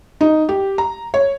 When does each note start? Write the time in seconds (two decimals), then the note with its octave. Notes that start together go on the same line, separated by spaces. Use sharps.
0.21 D#4
0.49 G4
0.78 A#5
1.14 C#5